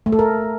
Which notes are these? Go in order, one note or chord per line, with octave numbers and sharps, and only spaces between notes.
A3
A4
A#4